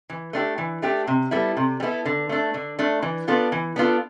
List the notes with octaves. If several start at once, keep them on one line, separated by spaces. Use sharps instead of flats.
E3
A3 D4 G4
E3
A3 D4 G4
C3
G3 B3 E4 A4
C3
G3 B3 E4 A4
D3
A3 D4
D3
A3 D4
E3
B3 D4 F4 A4
E3
B3 D4 F4 A4